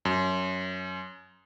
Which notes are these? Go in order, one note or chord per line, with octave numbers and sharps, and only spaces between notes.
F#2